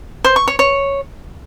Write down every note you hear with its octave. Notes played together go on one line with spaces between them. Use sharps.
C5
C#6
C#5
C#5